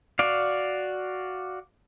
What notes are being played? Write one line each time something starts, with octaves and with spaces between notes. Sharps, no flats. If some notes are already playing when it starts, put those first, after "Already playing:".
F#4 D5 F5